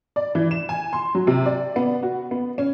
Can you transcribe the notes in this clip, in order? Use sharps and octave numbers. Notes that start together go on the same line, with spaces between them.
D5
E3
E7
G#5
C6
F#3
C3
D5
B3
F#4
B3
C#4